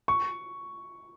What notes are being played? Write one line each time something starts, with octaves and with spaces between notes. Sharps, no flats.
C#6